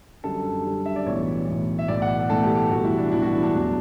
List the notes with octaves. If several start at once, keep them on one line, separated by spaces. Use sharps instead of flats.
F#2 D3 G3 A4
F#2 D3 G3
E5
D5
B1 A2 E3 C#5
B1 A2 E3
E5
B1 A2 E3 A3 D5
F#5
B1 A2 E3 A3 A4
G4
B1 A2 E3 G3 F#4
E4
D4
B1 A2 E3 G3 E4
F#4
D4
D4
E2 B2 F#3 A3